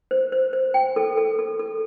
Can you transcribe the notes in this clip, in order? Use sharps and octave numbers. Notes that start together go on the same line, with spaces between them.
C5
C5
C5
G5
A4
A4
A4
A4